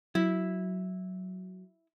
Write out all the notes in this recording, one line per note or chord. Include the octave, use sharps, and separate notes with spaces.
F#3 E4